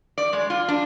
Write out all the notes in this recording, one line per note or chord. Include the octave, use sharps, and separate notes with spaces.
D5
G#3
F4
D4